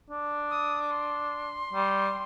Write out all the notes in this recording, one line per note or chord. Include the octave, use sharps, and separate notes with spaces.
D4
D#6
D6
C6
G3